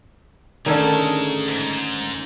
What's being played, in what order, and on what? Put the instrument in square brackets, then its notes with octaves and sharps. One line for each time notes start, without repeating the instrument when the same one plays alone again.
[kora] D3 D#3 [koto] A3 C#4 A4 [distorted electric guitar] G#4 A#5
[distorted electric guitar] G#2